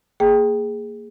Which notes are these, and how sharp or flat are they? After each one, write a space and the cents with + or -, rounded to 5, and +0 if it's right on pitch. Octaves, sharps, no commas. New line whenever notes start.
A#3 -15 G#4 +0 G5 +0